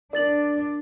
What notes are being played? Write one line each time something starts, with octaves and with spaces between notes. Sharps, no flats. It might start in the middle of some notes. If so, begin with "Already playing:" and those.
D4 A#4 D5 A6 F#7